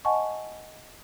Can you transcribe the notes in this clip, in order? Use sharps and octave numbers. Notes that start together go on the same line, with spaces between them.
D#5 F#5 G#5 A5 C#6